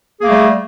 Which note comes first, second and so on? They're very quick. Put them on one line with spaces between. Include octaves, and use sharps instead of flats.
G#4 A#3 A3 G3